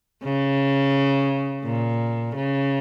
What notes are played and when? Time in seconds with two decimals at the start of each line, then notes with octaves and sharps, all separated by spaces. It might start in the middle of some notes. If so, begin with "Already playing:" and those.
0.24 C#3
1.65 A#2
2.36 C#3